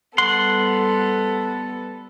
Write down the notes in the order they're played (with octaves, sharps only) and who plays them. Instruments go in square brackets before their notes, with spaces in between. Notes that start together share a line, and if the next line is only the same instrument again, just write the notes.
[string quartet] G3 B3 A4 [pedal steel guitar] F#5 C6